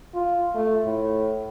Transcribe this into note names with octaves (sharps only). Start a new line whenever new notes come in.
F4
A3
A2